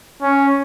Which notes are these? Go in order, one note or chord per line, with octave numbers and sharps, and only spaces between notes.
C#4